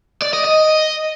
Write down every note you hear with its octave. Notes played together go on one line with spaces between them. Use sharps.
D5
D#5
D#5